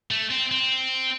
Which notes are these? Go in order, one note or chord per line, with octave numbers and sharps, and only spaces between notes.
A3
C4
C4